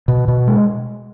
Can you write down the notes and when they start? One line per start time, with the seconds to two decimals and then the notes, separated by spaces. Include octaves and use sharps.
0.08 B2
0.28 B2
0.48 G#3